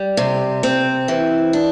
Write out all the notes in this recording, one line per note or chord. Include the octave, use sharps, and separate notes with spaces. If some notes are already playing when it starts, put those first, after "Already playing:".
Already playing: G3
C3
C4
E3
D4